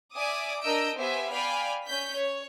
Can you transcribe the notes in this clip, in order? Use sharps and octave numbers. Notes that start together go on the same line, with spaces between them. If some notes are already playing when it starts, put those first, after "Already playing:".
D5 E5 G#5 D6 D#6
D4 A#4 D#5 E6 G6 D7
B3 G4 C5 E5 G#5
D5 F5 G5 G#5 B5
C#4 G6 B6
C#5